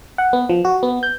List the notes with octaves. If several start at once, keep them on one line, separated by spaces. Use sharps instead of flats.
F#5
B3
F3
F#4
B3
G6